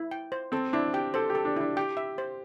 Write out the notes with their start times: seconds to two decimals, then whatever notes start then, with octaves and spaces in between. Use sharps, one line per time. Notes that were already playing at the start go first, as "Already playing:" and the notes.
Already playing: E4
0.11 G5
0.32 C5
0.52 C4 A4
0.73 D4 E4
0.94 G4 G5
1.14 A4 C5
1.30 G4
1.35 A4
1.45 D4
1.56 D4 E4
1.77 G4 G5
1.97 E5
2.18 C5